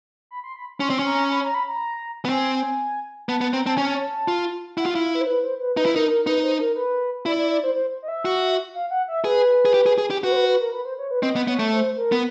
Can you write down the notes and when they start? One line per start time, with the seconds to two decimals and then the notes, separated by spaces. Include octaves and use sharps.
0.31 B5
0.44 C6
0.56 B5
0.80 C#4 C6
0.90 C4
0.99 C#4
1.06 A#5
1.31 B5
1.44 A#5
1.54 B5
1.68 A#5
2.25 B3
2.29 C4 G#5
3.28 B3 A5
3.41 B3 A5
3.53 C4 A#5
3.66 C4 A5
3.76 C#4 G#5
3.87 A5
4.28 F4
4.78 E4 F#5
4.86 F4
4.90 F5
4.95 E4
5.02 F5
5.15 B4
5.21 C5
5.27 B4
5.43 C5
5.60 B4
5.77 D#4 B4
5.86 E4
5.94 D#4 A#4
6.09 A#4
6.27 D#4 B4
6.43 C5
6.60 A#4
6.76 B4
7.26 E4 D5
7.38 D5
7.51 D5
7.63 C5
7.75 C5
8.02 D#5
8.08 E5
8.25 F#4
8.74 F5
8.91 F#5
9.08 E5
9.24 G#4 B4
9.65 G#4
9.74 G4
9.86 G#4
9.98 G#4
10.11 G4
10.24 F#4 B4
10.32 C5
10.37 B4
10.48 B4
10.61 A#4
10.73 B4
10.85 C5
10.99 C#5
11.11 B4
11.22 C4 D#5
11.36 B3
11.48 B3 C#5
11.59 A3
11.72 C5
11.97 A#4
12.12 B3